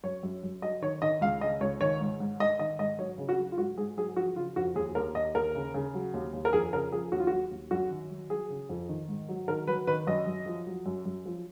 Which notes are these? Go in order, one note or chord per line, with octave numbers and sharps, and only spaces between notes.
F#2 C#5
F#2
F#2
F#3 D#5
D#3 C#5
D#3 D#5
C#2 F5
C#3 D#5
C#2 C#5
D#3 C#5
G#2
G#2
G#2 D#5
D#3 D#5
G#2 D#5
F#3 C#5
C#3
F#4
F#3
F4
G#2 F#4
G#2 G#4
F#3 G#4
F3 F#4
C#3 F4
F2 F#4
D#2 G#4
D#2 A#4
D#2 D#5
D#2 A#4
C#3
C#3
F#3
D#2
D#2
A#4
F2 G#4
C#3 A#4
F3 G#4
D#2 F#4
F4
F#3 F#4
D#2
F#2 F#4
D#3
F#3
F#3 G#4
C#3
F2
D#3
G#2
F#3
D#3 A#4
F#3 B4
D#3 B4
F#2 D#5
F#2
F3
F#3
F#2
F#2
F3